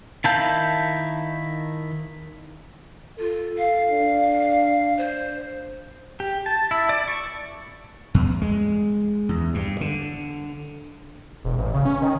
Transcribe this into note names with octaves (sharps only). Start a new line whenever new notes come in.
D#3 E4 F5 A5 G6
F4 A4
F5
D4
C5
G4
A5
E4
D5
C#6
E2
G#3
E2
G2
D3
E1
A1
C#3
C#4
D#3